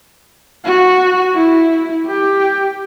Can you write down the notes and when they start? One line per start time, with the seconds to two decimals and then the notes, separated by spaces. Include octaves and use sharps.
0.65 F#4
1.34 E4
2.06 G4